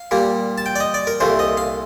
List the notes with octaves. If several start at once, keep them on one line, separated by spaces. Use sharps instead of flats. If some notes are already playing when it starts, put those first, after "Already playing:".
Already playing: F5
A#2 G3 A#3
A5
G5
D5
D#5
D5
A#4
C2 A#2 A3 C5
D#5
F5